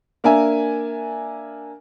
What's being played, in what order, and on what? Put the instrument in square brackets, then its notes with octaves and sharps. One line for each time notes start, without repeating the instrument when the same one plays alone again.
[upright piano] A#3 D4 A#4 E5 G#5